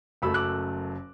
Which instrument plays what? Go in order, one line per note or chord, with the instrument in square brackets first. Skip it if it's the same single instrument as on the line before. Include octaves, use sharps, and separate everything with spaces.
[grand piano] F#1 F#2 F#3 A3 B5 E6
D6 F#6